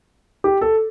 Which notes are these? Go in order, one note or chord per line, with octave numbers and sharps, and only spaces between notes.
G4
A4